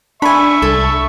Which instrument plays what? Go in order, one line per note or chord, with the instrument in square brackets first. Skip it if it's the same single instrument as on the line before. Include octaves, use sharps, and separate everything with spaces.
[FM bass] D4 [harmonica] E5 C#6 [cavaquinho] G#5 B5
[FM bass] C2 [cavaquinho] A4